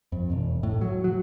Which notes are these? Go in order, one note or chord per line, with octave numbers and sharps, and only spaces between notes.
F2
E1
A2
F#3
F#3